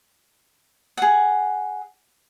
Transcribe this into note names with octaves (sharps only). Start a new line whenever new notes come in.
G#4 F#5